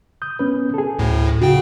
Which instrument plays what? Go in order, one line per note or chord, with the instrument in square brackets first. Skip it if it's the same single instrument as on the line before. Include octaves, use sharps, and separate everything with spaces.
[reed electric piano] D#6 G6
B3 C#4 B4
G#4 A4
[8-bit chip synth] D2 A2
[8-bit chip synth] C#3 G5 [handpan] F#4